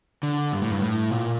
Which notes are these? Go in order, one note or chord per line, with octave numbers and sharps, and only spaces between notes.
D3
G2
A2
G2
A2
A#2